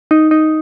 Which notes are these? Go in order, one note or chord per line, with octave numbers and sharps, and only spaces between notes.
D#4
D#4